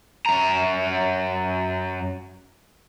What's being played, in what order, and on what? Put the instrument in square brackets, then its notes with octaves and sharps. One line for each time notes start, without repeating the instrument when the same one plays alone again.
[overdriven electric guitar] F#2 A#5